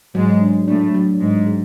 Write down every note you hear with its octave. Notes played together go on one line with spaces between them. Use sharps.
G#2 F#3 G#3
D4
A2 A3 D4
F#3
G#2 G#3 B3
G#3